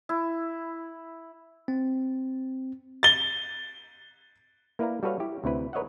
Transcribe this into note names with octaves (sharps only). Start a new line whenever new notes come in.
E4
C4
A6 G7
A#3 E4 B4 D5 F5 A#5
G3 F#4 A4 B4 C#5 F5
E4 G4
D2 C3 C4 E4 B4
A#4 B4 C#5 D#5 E5 F#5